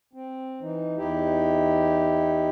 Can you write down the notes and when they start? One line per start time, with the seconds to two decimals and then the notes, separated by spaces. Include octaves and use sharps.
0.13 C4
0.61 E3 D#4
0.97 E2 D#4 E4 G4